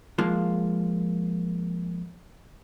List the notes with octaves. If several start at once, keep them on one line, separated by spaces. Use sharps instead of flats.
F3 G#3 A#3 F4